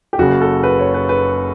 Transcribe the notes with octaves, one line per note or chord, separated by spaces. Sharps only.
G4
F#1 F#2 C#3 F#4
A4
B4
C#5
B4
B4